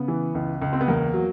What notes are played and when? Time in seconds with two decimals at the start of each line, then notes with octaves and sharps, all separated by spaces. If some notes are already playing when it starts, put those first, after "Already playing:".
Already playing: C#3 B3
0.08 E3
0.35 C#2
0.62 C#2
0.73 C4
0.81 B3
0.88 E2 A#3
1.13 F#3